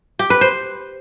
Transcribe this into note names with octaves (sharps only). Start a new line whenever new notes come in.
G4
B4
C5